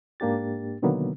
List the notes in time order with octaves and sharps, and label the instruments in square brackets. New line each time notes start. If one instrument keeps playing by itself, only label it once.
[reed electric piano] G#2 A#3 D4 G4 A6
B2 D3 D#3 F#3 A#3 B3